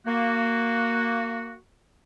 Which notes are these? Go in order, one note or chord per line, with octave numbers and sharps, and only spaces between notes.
A#3 F#4